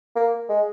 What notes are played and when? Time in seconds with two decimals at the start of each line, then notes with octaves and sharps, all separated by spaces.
0.16 A#3
0.49 G#3